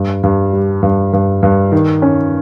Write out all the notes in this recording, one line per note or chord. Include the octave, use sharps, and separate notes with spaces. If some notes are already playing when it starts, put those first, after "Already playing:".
Already playing: G2
G2
G3
G2
G2
G2
D#3
C#4